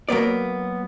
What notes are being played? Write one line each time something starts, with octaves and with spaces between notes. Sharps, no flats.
F#3 A#3 B3 D5